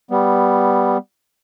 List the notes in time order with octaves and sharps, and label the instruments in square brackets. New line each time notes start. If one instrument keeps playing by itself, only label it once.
[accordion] G3 B3